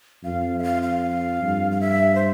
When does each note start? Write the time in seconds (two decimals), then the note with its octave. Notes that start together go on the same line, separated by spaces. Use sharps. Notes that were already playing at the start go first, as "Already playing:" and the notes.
0.24 F2 F5
0.59 E5
0.63 F5
0.82 F5
1.42 G2
1.72 F5
1.81 E5
2.15 C5